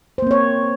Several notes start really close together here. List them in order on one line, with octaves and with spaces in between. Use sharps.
C5 A#3 C4 C#5